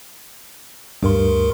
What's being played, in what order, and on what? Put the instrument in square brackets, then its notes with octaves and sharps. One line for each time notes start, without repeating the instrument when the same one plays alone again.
[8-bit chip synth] D2 A#4 C6 [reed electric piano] G2